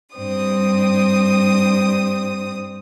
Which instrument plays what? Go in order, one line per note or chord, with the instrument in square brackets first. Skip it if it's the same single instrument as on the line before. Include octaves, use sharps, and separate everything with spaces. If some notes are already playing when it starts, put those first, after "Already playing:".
[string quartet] G2 C4 D#6